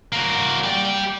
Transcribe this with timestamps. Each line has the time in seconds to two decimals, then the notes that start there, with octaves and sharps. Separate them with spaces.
0.13 A#3 F#4
0.64 G4 D5